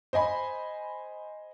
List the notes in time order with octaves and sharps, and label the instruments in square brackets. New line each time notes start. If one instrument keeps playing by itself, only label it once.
[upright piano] C5 D#5 G#5 B5